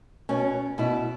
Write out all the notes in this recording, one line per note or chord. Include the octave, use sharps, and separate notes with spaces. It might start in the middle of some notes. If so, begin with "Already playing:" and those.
B2 C#4
B2 E4